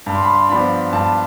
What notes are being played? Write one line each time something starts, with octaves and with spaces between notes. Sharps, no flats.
G2
C6
B5
C6
F3 B3 D4 B5
G2 A5